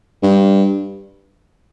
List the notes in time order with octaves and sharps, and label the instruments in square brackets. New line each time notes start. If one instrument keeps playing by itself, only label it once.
[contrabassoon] G2